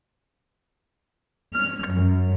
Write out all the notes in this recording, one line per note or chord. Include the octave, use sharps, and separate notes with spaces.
F6
F#2